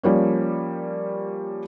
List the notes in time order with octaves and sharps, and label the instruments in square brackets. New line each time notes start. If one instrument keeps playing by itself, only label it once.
[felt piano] F3 G3 A#3 C#4